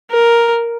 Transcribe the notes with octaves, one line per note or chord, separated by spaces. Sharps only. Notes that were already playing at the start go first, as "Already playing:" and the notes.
A#4